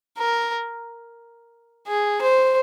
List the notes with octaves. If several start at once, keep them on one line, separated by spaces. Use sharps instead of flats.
A#4
G#4
C5